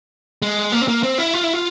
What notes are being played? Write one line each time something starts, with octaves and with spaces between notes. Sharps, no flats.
G#3
A#3
C4
A#3
C4
E4
F4
E4
F4